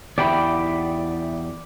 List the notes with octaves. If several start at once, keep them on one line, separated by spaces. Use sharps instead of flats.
E2 E4 G4 D5 G5 B5